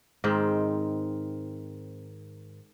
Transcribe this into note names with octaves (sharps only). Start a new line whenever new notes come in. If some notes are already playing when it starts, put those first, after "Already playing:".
G#2 D#3 C4